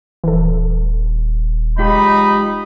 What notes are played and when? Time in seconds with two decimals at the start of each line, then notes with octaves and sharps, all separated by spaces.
0.24 D#1 E3 A4
1.78 G#3 D#4 F4 G4 B5